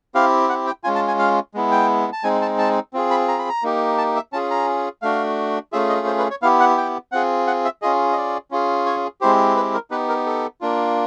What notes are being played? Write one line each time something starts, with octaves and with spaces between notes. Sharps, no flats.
C4 E4 G4 F5
F#5
G5
G#3 C#4 F4 G#5
A5
G#5
F5
G#3 B3 E4
G5
A5
G#3 C4 D#4 G#5
A5
A5
C4 F4 G#4
B5
A#5
B5
A#5
A#3 D#4 G4
A5
E5
C#4 F4 G#4 A5
A#5
A3 D4 F#4 F5
A3 C#4 F4 G#4 E5
D#5
C5
B4
C#5
B3 E4 G4 F5
F#5
G5
C4 F4 G#4 F#5
F#5
E5
C#4 F4 G#4 D#5
D#5
D5
C#4 F4 G#4
C#5
G#3 C4 E4 G4 C5
B4
A#4
B3 D#4 G4 B4
A#4
A4
A#3 D4 F4